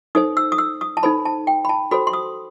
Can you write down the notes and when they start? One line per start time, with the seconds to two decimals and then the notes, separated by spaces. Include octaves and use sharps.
0.15 D#4 A4 C5 D#6
0.37 E6
0.52 D#6
0.58 E6
0.81 D#6
0.97 A5
1.03 D#4 A4 C5 B5
1.25 A5
1.47 G5
1.65 B5
1.69 A5
1.91 F#4 A4 C5 B5
2.07 C6
2.13 D#6